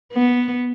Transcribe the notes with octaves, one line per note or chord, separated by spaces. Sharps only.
B3